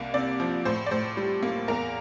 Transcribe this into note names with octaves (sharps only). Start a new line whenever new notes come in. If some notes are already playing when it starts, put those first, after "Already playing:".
Already playing: C2 A#3
C3 D5
F3
A2 C5
D5
A2 C5
G3
A#3
E2 A#4